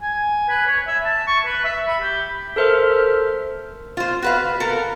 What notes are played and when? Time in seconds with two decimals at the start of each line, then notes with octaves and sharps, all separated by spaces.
0.02 G#5
0.49 B4
0.67 C#5
0.87 E5
1.05 A5
1.27 C#6
1.45 B4
1.65 E5
1.88 B5
2.02 G4
2.56 A4 A#4 C5 E5 F6
3.97 F4 C5
4.22 F#4 B4 F5
4.60 A4 A#4